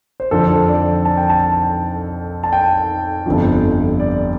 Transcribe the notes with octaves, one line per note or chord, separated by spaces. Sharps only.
C5
F2 D3 F3 C4 A4
D5
A5
G5
A5
A5
G5
G1 F2 D3 F3
D5